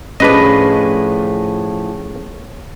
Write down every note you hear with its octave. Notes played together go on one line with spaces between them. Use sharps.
A2 F3 C#4 D4 G#4 B4 D#5